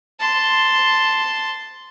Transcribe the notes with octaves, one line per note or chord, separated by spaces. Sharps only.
A5 C6